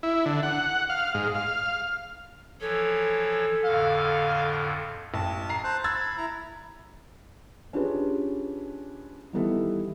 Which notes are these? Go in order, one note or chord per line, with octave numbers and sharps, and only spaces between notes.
E4
D3
F#5
F5
G#2
F5
E3 F3 A4 C#5
F2 A2 D3 F5
A1 A5
A#5 C7
C5 A5 F#6
B5 E6 G#6 A6
E4 A#5
C#4 D4 F4 G4 G#4 B4
D#3 E3 G3 B3 E4 A4